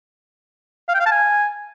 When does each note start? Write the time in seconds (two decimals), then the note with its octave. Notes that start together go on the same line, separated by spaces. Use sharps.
0.88 F5
0.94 G5
1.00 F5
1.06 A5
1.12 G#5